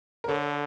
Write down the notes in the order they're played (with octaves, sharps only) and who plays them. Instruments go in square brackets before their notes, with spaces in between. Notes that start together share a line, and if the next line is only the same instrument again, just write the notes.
[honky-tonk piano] A#4
[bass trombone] D3 [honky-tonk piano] A4 C#5